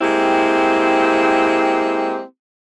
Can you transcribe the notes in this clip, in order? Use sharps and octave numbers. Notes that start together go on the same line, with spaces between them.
G#3 A#3 C4 E4 G4